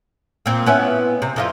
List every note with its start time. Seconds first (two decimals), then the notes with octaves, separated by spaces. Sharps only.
0.46 A#2 C4
0.66 B3 C#4 E4
1.22 C3
1.36 F2 D#4 F4